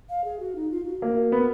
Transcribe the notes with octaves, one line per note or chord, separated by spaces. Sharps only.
F5
G#4
F#4
D#4
F4
F#4
A#3
B3